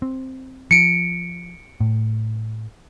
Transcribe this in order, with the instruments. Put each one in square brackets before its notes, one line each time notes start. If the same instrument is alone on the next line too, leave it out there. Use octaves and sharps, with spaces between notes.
[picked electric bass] C4
[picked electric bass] F3 [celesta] C#7 D7
[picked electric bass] A2